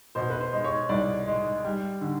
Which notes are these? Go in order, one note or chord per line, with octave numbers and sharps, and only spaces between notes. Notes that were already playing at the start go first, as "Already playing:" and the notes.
B2 C5
B4
C5
G#3
C#5
C2 D5
G#3
G3
D3